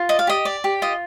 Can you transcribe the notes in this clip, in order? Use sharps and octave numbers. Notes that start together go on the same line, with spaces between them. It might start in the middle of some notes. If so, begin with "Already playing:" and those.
Already playing: F4
D5 D#5
F5
G4 D#5
D5
G4
F4 D#5